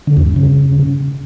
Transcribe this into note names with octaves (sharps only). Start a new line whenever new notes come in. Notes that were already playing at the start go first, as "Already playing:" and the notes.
D3
E2
G2
C#3